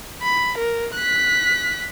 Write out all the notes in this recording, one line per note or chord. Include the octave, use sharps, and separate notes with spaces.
B5
A#4
F#6 B6